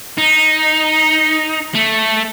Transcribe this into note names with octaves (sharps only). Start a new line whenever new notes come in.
D#4
A3